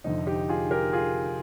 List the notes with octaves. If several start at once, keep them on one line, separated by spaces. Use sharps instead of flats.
F1 F2 D3 D#4
D#4 G4
F4 G#4
G4 A#4
F4 G#4